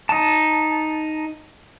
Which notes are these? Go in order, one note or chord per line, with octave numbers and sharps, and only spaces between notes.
D#4 A5